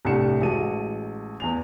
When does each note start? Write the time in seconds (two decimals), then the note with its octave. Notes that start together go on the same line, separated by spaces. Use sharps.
0.05 C2 A2 D4 G4 C#7 E7
0.41 A1 G#3 F#4 A5 D#7
1.40 E2 G#5 F7